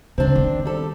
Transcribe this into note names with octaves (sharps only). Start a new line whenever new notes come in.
C#2 C#3 C4 D4
D#3 B3
G3 A4